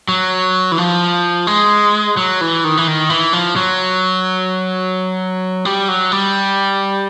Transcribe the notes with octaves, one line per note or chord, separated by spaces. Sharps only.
F#3
E3
F3
G#3
F#3
E3
D#3
E3
D#3
E3
F3
F#3
G3
F#3
G3